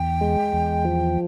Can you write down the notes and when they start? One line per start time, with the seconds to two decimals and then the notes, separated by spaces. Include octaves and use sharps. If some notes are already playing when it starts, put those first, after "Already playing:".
Already playing: E2 G5
0.21 G#3
0.53 E2
0.85 F3